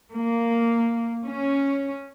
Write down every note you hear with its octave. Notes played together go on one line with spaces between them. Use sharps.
A#3
C#4